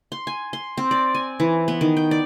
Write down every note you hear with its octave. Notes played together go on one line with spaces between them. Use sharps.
C6
G#5
C6
C4
D5
G#5
E3
B3
D#3
G5
D5